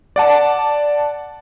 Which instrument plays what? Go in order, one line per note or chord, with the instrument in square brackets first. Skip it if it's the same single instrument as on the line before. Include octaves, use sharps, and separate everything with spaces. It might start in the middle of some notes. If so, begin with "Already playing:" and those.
[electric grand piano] D5 F#5 A5